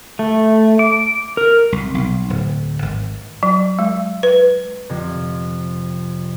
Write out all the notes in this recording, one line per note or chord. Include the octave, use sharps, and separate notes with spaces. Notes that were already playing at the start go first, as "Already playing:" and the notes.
A3
D6
A#4
C2
B1
D1
G#1
F#3
G#3
B4
F2 C3